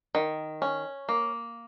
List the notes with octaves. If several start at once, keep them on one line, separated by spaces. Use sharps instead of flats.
D#3
C#4
A#3